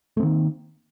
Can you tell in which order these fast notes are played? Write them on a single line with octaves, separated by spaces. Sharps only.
A3 C4 D#3 A#3